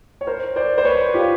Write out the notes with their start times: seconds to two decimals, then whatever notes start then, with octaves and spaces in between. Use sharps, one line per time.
0.21 C#5
0.27 A#4 C5
0.56 C5 D5
0.78 C5
0.85 B4 C#5
1.14 F4 G4